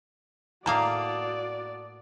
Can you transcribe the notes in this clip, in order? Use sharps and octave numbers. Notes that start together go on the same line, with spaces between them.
A2 A#3 F#4 D5 F5 A5 D#6